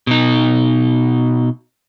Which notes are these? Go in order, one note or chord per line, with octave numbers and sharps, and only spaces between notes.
B2 D#4